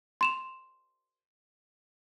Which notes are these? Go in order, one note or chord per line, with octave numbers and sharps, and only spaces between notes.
C6 E7 F7